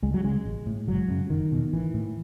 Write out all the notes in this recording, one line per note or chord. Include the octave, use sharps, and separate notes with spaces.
C#2 G#3
F#3
C#3 G#3
A1
A2
F#1 F#3
F#2 C#3
F#1 D#3
E2 B2
A1 E3
A2